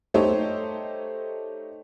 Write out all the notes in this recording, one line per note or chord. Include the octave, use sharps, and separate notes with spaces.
A3 D#4 G4 A4 C5 C#5